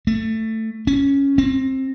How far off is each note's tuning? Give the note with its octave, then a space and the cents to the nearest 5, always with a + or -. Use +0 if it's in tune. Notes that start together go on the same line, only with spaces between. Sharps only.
A3 +15
C#4 +0
C4 +20